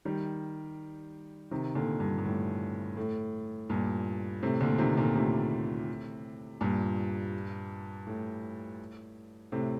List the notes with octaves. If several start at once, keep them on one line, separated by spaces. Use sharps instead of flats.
D#3 G3
C3 D#3
A#2 D3
G2
G2
A2
A2
G2 A#2
A2 C3
A#2 D3
C3 D#3
A#2 D3
A2 C3
G2 A#2
A2
A2 C3